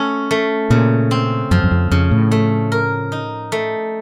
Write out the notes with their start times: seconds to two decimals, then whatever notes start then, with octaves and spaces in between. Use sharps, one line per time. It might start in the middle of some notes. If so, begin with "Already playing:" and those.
Already playing: A3 C#4 A4
0.31 A3
0.70 A#2 C#3
1.11 C4
1.51 F#2 F3
1.64 F#2
1.71 F2
1.91 F2 C#3
2.11 A2
2.31 A3
2.72 A#4
3.12 D#4
3.52 A3